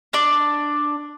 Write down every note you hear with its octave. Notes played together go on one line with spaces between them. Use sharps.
D4 D5